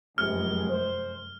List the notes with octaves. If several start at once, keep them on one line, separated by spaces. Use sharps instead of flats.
F1 C#2 F#2 C3 G#3 F6
C5